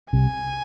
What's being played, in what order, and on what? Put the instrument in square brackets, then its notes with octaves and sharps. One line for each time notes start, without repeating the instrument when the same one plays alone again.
[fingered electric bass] C2 C3 [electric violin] G#5